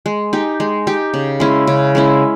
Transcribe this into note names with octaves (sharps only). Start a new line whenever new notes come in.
G#3
D#4 G4
G#3
D#4 G4
C#3
G#3 C#4 E4
C#3
G#3 C#4 E4